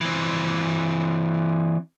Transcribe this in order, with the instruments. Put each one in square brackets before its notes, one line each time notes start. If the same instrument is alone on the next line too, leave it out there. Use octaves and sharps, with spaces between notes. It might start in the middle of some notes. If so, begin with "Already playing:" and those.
[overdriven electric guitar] E3 C4